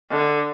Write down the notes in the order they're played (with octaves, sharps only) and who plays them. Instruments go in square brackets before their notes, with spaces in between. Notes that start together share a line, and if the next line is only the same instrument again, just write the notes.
[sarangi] D3